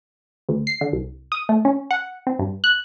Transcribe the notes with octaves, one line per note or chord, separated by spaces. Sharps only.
D2
C7
D3
C2
D#6
A3
C#4
F#5
C4
G2
F#6